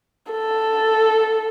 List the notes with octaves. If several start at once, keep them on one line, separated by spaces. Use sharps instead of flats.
A4